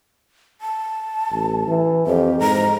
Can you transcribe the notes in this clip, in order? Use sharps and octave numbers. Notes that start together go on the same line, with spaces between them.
A5
A1
E3
F2 G4
G#2 A#5